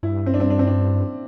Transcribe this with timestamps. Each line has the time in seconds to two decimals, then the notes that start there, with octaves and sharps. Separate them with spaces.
0.03 G2 E4
0.26 C4
0.34 D4
0.40 C4
0.50 D4
0.59 C4
0.67 D4